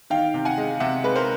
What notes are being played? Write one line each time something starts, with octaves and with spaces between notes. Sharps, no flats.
D#3 F5 G5
C3
F#5 G#5
G#3
C3 E5 F#5
G#3 B4
A#4 C5